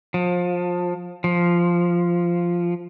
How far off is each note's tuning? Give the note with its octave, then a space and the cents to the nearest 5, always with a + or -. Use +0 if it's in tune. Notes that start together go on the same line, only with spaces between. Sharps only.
F3 +25
F3 -5